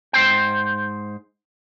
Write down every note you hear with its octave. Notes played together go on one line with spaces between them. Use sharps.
G#2 C5 G5